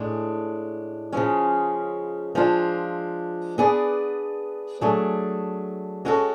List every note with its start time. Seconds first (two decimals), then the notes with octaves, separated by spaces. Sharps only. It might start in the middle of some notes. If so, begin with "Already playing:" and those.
Already playing: A2 G#3 D4
1.12 C#3 F3 G#3 C#4
2.35 F3 G#3 D4 F4
3.58 B3 D4 G#4 B4 D5
4.81 F#3 A3 D4 G#4
6.05 G#3 C#4 F#4 A4